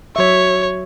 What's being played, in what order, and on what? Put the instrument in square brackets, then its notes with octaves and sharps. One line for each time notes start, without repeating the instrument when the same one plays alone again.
[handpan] F#3 E5 [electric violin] C#5